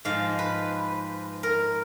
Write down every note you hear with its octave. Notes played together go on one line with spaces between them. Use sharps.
G#2 F3 F5
B4
A#4